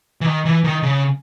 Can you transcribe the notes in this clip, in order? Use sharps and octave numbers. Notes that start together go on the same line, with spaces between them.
E3
D#3
E3
D#3
C#3